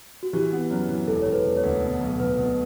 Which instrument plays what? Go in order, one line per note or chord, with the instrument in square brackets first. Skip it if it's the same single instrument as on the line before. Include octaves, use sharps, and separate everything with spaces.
[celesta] F#4
[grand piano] E3 [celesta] G4
[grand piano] B3
F#2
E3
[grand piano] E1 [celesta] A4
[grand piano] E1 [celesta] C#5
[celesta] B4
[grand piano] E1
[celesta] C#5
[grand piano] D2
B2
B1
[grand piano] B1 [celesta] B4
[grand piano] B2